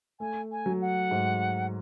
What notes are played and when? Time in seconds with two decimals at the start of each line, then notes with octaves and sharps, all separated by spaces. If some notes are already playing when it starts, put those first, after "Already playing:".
0.20 A3 G#5
0.51 G#5
0.66 F#3
0.81 F#5
1.11 G#2